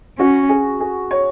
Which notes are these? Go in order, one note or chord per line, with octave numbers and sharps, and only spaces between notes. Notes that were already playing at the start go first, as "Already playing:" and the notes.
C#4 F#4
G#4
G#4
C#5